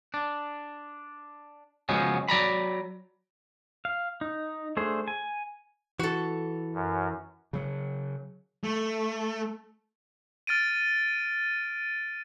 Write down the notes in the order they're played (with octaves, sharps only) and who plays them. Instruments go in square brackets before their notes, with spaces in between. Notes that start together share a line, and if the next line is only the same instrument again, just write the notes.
[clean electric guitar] D4
C#3 F3 F#3 G#3 B3 C#4
F#3 D5 A#5 B5
[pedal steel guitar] F5
D#4
A3 D4 G#4 C5
G#5
[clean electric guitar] E3 [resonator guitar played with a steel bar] F#4 A4
[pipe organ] F#2
[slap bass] C#3 F#3
[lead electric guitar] A3
[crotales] F6 A6 D7 D#7